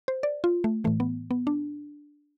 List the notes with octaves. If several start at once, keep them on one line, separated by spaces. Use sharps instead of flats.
C5
D5
F4
A3
A2 E3 A3
B3
B3
D4